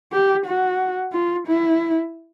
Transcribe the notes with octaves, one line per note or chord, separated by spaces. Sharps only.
G4
F#4
F4
E4